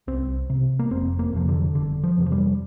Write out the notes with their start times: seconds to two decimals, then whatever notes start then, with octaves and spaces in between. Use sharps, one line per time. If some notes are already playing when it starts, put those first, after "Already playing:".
0.07 C2 C4
0.50 C3
0.79 A#3
0.91 F1 C4
1.19 A#3
1.33 F2 C3 F3
1.48 D3
1.75 G1 D3
2.04 F3
2.17 F2 C3
2.26 F3
2.32 G3